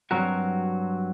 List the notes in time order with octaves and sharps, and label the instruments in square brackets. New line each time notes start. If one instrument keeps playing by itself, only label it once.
[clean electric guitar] G2 F#3 C4 F#4 A#4